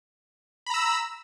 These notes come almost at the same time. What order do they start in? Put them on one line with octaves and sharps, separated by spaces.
B5 A#5 E6